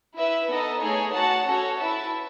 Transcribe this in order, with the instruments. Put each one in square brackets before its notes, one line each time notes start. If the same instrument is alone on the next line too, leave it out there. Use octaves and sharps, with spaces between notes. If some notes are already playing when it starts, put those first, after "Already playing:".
[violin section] E4 B4 E5
B3 D#4 A4 D#5
A3 D#4 G#4 C#5
F#4 C#5 F#5 A5
C#4 F#4 A4 C#5
E4 B4 E5 A5